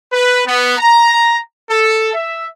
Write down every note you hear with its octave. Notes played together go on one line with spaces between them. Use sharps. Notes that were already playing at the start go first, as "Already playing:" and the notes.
B4
B3
A#5
A4
E5